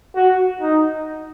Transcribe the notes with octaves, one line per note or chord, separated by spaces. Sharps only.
F#4
D#4